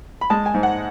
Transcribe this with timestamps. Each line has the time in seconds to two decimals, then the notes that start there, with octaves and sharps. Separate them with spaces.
0.21 B5
0.30 G#3 A5
0.46 G#5
0.54 G#2
0.63 F#5